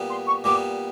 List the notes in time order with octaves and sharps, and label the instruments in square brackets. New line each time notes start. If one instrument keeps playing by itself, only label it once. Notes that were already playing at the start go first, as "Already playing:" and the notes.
Already playing: [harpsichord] A#2 G3 B3
[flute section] C6
C#6
[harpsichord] A#2 G3 B3 [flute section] D6